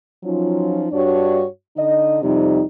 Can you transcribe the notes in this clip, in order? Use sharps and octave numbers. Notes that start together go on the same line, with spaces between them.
F3 F#3 C#4 D#4 F4
G2 D4 F#4 C#5
D3 D#4 D#5
F2 C3 G3 D#4